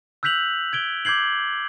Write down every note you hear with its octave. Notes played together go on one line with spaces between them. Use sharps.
E6 F#6 G6 B6 F7 F#7
G#6 D7 G7
D6 G6 G#6 C7 F#7